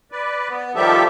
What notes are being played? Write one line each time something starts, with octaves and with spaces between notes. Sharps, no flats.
B4 D5
B3
D#3 F3 G3 G4 A4 E5